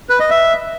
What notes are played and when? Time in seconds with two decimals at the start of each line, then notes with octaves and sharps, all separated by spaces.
0.09 B4
0.20 D#5
0.30 E5